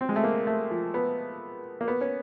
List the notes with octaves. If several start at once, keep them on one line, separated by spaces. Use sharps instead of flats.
C4
G#3
A3
A#3
A3
F3
B3
A#3
B3
C#4